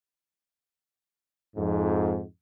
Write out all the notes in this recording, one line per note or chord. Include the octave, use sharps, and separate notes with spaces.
F2 G#2